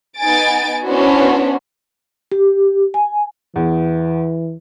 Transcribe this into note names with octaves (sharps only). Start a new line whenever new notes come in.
B3 D#4 G#5 A6 D7
B3 C#4 D4 E4 F#4 C5
G4
G#5
E2 E3